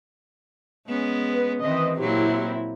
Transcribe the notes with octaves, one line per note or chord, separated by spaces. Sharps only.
G#3 B3 C#4
B4
D#3 E3 C4 B4 D#5
A#2 F#3 A#3 C4 E4 G4